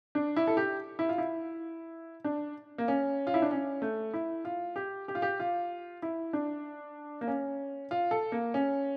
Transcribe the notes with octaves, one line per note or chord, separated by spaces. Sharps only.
D4
E4
A4
G4
E4
F4
E4
D4
A#3
C#4
F4
E4
D4
C#4
A3
E4
F4
G4
G4
F4
G4
F4
E4
D4
A#3
C#4
F4
A4
A#3
C#4